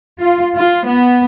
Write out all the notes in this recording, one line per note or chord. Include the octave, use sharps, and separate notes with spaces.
F4
F4
B3